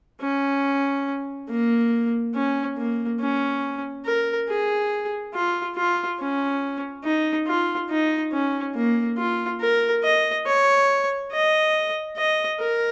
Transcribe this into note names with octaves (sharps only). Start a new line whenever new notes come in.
C#4
A#3
C#4
A#3
C#4
A#4
G#4
F4
F4
C#4
D#4
F4
D#4
C#4
A#3
F4
A#4
D#5
C#5
D#5
D#5
A#4